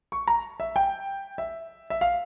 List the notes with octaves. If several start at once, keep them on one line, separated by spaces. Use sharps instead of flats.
C#6
A#5
E5
G5
E5
E5
F5